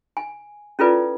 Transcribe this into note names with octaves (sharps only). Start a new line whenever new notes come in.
G#5
C#4 E4 F4 A4 B4 D5